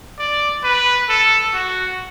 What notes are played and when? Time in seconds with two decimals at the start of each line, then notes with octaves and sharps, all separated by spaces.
0.19 D5
0.64 B4
1.09 A4
1.54 F#4